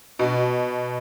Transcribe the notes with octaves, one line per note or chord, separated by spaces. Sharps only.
B2